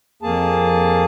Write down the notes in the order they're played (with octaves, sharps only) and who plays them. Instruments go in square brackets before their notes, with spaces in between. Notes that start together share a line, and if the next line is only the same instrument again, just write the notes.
[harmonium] F2 A#3 G#4 A5